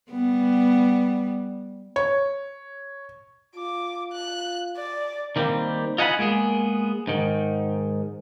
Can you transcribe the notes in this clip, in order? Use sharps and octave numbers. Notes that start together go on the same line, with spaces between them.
G3 B3
C#5
F4 D6
F#6
D5
D#3 G3 A#3 C4
F4 D#5 F#5 G#5 A#5 B5
G#3 A#3 B3 G#4
G#2 D#3